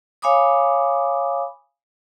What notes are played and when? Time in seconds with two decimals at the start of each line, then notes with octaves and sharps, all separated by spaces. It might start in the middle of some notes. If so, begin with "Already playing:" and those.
0.22 C#5 F5 G#5 B5 D6 D#6